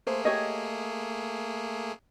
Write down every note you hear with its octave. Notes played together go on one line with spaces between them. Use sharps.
A3 A#3 G#4 C5
G4 C#5 D#5